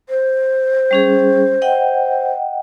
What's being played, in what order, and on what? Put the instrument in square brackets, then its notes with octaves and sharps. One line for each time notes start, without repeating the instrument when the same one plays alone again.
[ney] C5
[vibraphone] G3 C#4 G#4
D#5 F#5 G5